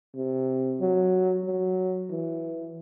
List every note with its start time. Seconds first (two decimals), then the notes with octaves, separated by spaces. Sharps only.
0.15 C3
0.81 F#3
1.46 F#3
2.11 E3